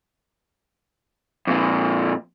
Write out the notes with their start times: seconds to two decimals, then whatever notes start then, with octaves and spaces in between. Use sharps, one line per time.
1.47 F2 A#2